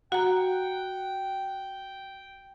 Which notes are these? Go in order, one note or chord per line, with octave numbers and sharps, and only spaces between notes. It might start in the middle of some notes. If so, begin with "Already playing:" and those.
F#4 F#5 G5 A#5